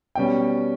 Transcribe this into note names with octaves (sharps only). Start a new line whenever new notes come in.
B2 G3 C#4 G5